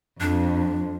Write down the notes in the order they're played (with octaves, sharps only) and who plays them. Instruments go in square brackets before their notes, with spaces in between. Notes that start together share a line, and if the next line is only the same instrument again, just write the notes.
[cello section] F2 [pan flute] D4